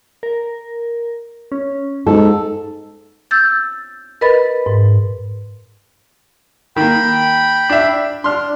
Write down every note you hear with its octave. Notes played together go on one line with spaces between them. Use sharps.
A#4
C#4
G#2 A4
E6 G6 A6
A#4 B4 D#5 B5 A6
G#2
D#3 A#3 G5 B5
D4 E5
D4 C6 F6